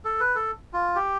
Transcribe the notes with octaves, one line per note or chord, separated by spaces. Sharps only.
A4
B4
A4
F4
G4